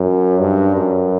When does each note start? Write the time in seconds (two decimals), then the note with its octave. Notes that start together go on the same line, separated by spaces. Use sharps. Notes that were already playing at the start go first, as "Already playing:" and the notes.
Already playing: F#2
0.40 G2
0.76 F#2